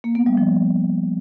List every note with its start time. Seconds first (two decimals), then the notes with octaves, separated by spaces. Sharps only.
0.04 A#3
0.15 B3
0.26 G3
0.37 F3